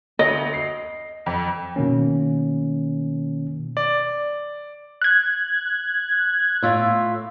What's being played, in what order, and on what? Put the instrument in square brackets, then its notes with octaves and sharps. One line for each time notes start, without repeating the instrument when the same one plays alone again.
[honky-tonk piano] D2 [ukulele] D#5
[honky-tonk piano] C7
F2
[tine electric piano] B2 D#3 A#3 C#4
[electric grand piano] D5
[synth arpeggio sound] F#6 G#6
[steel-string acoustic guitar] A2 F4 E5